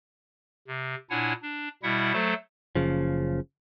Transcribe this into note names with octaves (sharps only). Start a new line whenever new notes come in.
C3
A#2 D4 E4 C#5 F#5 G#5
D4
B2 G3 E4 E5 F#5
F#3 A3 A4 C5
F#1 C#3 F3